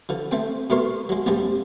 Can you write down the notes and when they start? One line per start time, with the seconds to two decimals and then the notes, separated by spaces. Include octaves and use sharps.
0.09 D3 F3
0.31 A3 C4 G5
0.70 B2 A3 D4 A#4 C#5 C6
1.09 F#3 G#3
1.26 A#1 F2 F3 G3 G#3